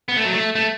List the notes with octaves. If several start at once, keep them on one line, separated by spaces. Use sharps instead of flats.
B3
A3
F#3
A3
A3